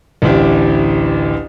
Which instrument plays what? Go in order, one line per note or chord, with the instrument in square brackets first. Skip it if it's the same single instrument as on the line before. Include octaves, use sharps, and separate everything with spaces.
[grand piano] A1 D2 D4 E4 G4